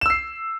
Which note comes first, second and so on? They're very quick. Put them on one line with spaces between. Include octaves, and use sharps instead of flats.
E7 E6 C7